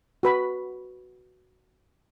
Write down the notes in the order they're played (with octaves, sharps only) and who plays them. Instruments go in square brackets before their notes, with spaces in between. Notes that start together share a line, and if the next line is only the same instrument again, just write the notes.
[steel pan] F#4 B4 B5